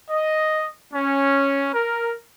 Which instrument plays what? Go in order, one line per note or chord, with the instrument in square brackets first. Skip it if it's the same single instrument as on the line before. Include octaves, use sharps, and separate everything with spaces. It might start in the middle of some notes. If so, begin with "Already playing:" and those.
[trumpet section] D#5
C#4
A#4